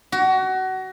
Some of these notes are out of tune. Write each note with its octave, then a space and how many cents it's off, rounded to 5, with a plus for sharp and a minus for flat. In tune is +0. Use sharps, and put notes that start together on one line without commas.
F#4 +25